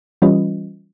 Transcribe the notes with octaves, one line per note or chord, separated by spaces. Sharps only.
E3 G3 C#4 F4 B4 D#5